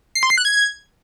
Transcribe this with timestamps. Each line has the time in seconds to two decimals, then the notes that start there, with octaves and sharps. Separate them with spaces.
0.15 C7
0.23 C6
0.30 C7
0.38 F#6
0.45 G#6